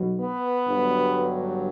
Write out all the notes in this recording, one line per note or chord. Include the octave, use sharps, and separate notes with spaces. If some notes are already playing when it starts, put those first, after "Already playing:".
Already playing: B1 B2 F#3
B3
G1 G2 F#3